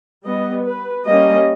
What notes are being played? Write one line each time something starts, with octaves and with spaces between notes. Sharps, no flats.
G3 B3 D#5
B4
G3 A#3 C#4 D#5